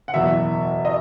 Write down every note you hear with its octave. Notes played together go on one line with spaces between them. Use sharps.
F#5
F#1 E2 B2 E5
D#5